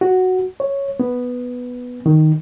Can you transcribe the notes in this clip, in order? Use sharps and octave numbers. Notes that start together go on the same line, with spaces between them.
F#4
C#5
B3
D#3